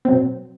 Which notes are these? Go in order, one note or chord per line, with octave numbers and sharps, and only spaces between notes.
B2 F#3 C4